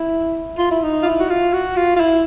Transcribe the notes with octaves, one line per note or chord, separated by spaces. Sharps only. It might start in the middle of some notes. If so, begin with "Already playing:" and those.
Already playing: E4
F4
E4
D#4
F4
E4
F#4
F4
F#4
F4
F4
E4